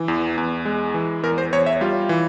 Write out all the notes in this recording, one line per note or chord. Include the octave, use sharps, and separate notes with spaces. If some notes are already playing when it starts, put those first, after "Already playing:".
Already playing: E3
E2
E2
G#3
E3
E2 A#4
C5
E2 C#5
E5
G3 F4
E3